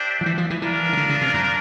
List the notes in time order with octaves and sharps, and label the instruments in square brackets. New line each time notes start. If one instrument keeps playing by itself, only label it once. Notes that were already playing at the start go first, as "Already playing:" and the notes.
Already playing: [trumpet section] D4 G4 C5 E5 G5
[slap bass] F3
E3
F3
E3
[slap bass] E3 [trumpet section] D4 F4 A#4
[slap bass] C#3
D3
C#3
C3
F#2